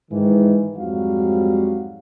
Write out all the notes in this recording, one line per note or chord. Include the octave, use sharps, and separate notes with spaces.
G#2 D#3 E3
F2 G#2 F#3 G3 F#4 F5